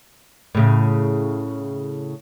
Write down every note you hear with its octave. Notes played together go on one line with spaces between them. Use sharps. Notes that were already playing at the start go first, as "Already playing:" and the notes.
A2 C#3